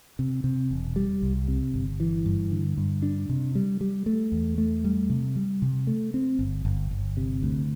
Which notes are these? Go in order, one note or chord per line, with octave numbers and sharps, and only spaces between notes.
C3
C3
E1
G3
C2
C3
G1
E3
G2
D3
G2
D4
C3
G3
G3
A3
E2
A3
G3
C3
G3
C3
A3
C4
G1
G1
G1
C3
D2